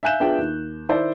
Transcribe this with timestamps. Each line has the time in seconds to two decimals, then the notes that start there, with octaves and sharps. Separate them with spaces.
0.03 E5 F5 G#5 F#6 G6 E7
0.20 B3 D4 F4 G#4 E5 G5
0.38 D#2
0.89 D#3 E4 C5 D5